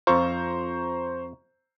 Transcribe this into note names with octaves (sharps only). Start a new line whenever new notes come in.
F2 F4 C5 A#5 C#6